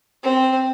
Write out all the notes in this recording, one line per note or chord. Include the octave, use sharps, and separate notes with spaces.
C4